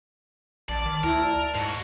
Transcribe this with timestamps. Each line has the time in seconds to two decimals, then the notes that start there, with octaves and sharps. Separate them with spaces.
0.69 A1 D5 A5
0.86 D#3
1.04 D2 E4 A#4
1.23 D5
1.55 G#2 G#3 F#4